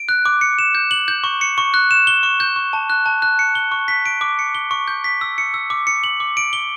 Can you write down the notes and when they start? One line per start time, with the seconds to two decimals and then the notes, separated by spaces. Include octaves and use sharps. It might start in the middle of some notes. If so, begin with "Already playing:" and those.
Already playing: D7
0.09 F#6
0.26 D6
0.41 C#7
0.59 E7
0.75 G6
0.91 F#7
1.08 G6
1.24 C#6
1.41 C#7
1.58 C#6
1.74 F#6
1.91 E7
2.07 G7
2.23 C#6
2.40 G6
2.56 C#6
2.73 A5
2.90 F#6
3.06 A5
3.22 F#6
3.39 C#7
3.55 G7
3.72 C#6
3.88 B6
4.06 D7
4.21 D6
4.39 C#7
4.55 G7
4.71 C#6
4.88 G6
5.04 B6
5.21 E6
5.38 C#7
5.54 E6
5.70 D6
5.87 C#7
6.04 F#7
6.20 D6
6.37 D7
6.53 G7